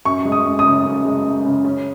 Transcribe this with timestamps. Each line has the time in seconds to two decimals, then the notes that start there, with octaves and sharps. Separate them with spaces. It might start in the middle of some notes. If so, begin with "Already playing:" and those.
0.05 F#2 C#6
0.25 G#3
0.32 D#6
0.45 F#2
0.59 D#6
0.65 C#3
0.85 F#2
1.05 G#3
1.25 F#2
1.45 C#3
1.65 C#4